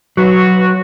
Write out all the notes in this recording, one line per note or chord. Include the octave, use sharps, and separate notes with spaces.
F#3 F#4 B4